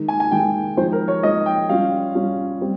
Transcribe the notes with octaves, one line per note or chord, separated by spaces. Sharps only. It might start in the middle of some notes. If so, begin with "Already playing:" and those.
Already playing: D#3 G#3 D#4
G#5
G#5
D#3 G#3 D#4 G5
F3 G#3 D#4 C5
A#4
C#5
F3 G#3 D#4 D#5
G5
G3 C#4 F4 F5
G3 C#4 F4
G3 C4